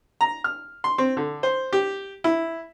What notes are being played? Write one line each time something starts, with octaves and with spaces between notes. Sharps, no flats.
A#5
F6
C6
C4
D3
C5
G4
E4